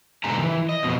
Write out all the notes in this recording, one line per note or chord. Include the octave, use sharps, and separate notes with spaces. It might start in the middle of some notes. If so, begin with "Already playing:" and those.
G#2 B2 D3 G4 G#5 A#5
D#3 E3
D#5
F2 B2